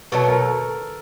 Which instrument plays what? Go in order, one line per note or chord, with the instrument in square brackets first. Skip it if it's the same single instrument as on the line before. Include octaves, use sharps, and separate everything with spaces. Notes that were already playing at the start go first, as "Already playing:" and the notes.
[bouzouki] B2 F#3 A3 [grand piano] B4
[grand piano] A#4
A4